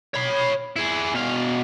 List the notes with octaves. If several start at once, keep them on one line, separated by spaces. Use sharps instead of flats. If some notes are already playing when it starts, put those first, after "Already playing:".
C#5 B5
E4 G#4
B2 F5